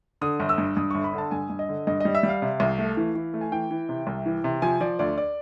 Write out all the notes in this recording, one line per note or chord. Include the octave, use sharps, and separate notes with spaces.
D3 D#6
G1
E6
G2
G2 D#6
G1 C#6
B5
D3
A5
G2 G#5
G2
D#5
D3
G2 D#5
G3 D#5
E5
G3
F5
C3
C2
A3
E3
E3
A3
G#5
E3 G5
E3
C3
C2
E3
C3
F3 G#5
F3 D5
D2 D5
D5